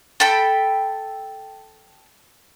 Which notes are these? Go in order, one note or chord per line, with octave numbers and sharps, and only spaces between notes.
A4 G5 B5